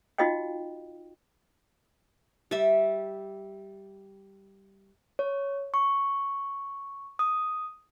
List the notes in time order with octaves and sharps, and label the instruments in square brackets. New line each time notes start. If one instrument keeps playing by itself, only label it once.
[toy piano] D#4 F4 F#4 D#5 F5 G5
[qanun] G3 E5
[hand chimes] C#5
C#6
D#6